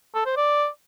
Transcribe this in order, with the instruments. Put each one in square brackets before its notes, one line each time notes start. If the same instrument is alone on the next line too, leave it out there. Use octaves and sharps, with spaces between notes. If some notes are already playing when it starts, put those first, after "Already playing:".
[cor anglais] A4
C5
D5